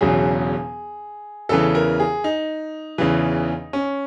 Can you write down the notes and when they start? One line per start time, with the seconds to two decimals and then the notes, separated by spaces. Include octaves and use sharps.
0.01 E1 E2 C#3 F#3 G#4
1.49 E2 C#3 E3 A4
1.75 A#4
2.00 G#4
2.24 D#4
2.98 E2 C#3 E3
3.73 C#4